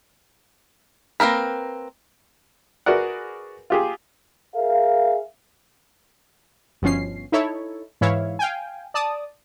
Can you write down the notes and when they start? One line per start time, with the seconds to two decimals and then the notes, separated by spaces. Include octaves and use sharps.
1.20 A#3 C4 A#4 B4
2.86 F#4 G#4 A#4 B4 D5 F#5
3.70 F4 G4 G#4
4.55 G#4 A#4 E5 F5
6.82 G1 B2 F3 C#4 C7
7.32 D#4 E4 A4 C#5
8.01 G#2 E3 E4 C#5 F5
8.39 F5 G5 G#5
8.94 D5 A5 D#6